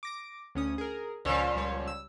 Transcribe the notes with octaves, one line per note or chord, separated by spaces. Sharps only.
D6 A#6 D7
D2 C#4 D#6
G#4 A#4
C#2 A#2 F3 C#5 E7
C#2 G3 C#5
E6